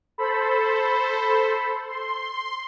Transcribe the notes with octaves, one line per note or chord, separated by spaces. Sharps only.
A4 C5 B5
C6